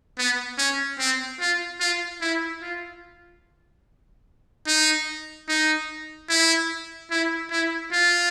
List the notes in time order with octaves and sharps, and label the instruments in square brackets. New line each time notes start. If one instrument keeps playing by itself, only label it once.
[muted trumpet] B3
C#4
C4
F4
F4
E4
F4
D#4
D#4
E4
E4
E4
F4